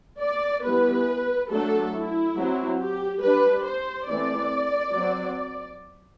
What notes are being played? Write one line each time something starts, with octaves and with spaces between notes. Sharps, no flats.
D5
E3 G3 B3 B4
F#3 A3 D4 A4
E4
F#3 C4
G4
G3 D4 B4
C5
E3 A3 C4 D5
F#3 C4